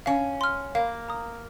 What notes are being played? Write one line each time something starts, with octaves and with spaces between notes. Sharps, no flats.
C#4 F5
C6 F6
A#3 F5
A#5 D#6